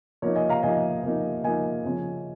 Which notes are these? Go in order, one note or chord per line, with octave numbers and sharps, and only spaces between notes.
F3 A#3 D#4 C#5
D#5 G#5
F5 A#5
F3 A#3 D#4 D#5 G#5
F3 A#3 D#4
F3 A#3 D#4 D#5 G#5
C#3 F3 C#4